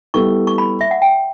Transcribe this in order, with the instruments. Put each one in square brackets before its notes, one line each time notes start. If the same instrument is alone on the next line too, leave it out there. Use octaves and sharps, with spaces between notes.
[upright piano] G3 B3 E4 A4 [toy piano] C#6
[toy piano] C#6
B5
E5
F#5
G5